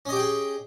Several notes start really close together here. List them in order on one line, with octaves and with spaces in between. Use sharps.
C#4 D#5 G4 G5 G#4